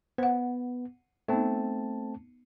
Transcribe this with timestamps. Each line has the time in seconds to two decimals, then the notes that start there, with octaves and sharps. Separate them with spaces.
0.18 B3 C5 F#5
1.28 A3 B3 C4 D#4 A5